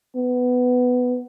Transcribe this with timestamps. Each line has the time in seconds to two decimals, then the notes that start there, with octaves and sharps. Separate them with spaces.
0.16 B3